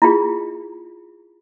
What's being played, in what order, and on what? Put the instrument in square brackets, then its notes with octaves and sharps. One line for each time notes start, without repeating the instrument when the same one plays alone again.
[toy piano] E4 F4 G#4